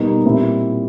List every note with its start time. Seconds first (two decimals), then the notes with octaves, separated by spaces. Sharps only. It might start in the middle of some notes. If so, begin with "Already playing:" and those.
Already playing: B2 G3 A#3 D#4
0.25 A#2 G3 C4 E4